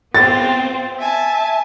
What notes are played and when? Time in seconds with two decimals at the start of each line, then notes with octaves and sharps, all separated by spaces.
0.15 B3 C4 F4 A6
0.99 E5 G#5 A5